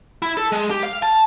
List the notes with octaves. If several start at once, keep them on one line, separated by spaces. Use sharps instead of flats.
E4
A4
G#3
G4
F5
A5